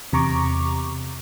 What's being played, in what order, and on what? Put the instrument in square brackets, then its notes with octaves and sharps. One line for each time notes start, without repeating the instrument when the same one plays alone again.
[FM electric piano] E2 C3 A#5 C#6 D6